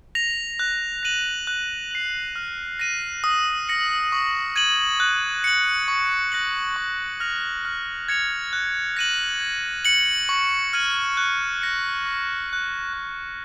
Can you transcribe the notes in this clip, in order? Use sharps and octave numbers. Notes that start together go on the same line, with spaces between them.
A#6 F7
F#6
A#6 D#7 F#7
F#6
C7 F#7
F6
A#6 D#7
D#6
A#6 C#7 F#7
C#6
G#6 D#7 F#7
F#6
C#7 F#7
C#6
F#6 A#6 C#7 F#7
C#6
F6 A#6 F7
F6
G#6 C#7 F7
F#6
A#6 D#7 F#7
G#6
C#7 F#7
C#6
F6 G#6 D#7 F#7
F#6
A#6 C#7
C#6
F#6 C#7
F#6